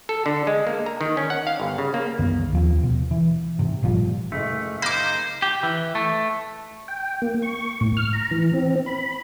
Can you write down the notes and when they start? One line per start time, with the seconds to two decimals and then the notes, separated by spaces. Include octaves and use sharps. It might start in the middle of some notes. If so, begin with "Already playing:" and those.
0.09 A4
0.26 D3
0.47 G#3
0.67 A#3
0.86 A#5
1.01 D#3
1.17 C#4
1.30 F#5
1.47 F5
1.60 G1
1.78 C#3
1.94 A#3
2.19 C2 F#2 D#3 B3
2.53 D#2 F3 C4
2.81 D#1 B2
3.11 E3
3.59 G#2 C3
3.83 G1 A#2 F3 G3
4.32 F#1 G#3 A3
4.82 A#3 D#4 C5 B5 D6
5.42 G4
5.63 E3
5.95 A3
6.88 G5
7.22 A#3
7.42 C#6
7.81 A2
7.97 F6
8.13 A#5
8.31 E3
8.53 C4
8.86 B5